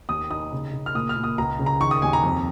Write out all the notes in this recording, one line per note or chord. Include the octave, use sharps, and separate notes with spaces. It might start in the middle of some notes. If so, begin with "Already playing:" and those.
D#2 D#6
D#4 D#6
C#3
C#3
F6
A#2 D#6
F6
A#2
D#6
C#2 A#5
C#3
A#5
D#3 C#6
D#6
D#2 G#5
A#5
F2